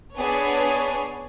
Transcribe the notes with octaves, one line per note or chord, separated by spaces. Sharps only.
B3 D4 G#4 C#5